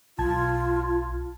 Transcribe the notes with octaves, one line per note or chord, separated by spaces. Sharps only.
B1 F4 A5 G#6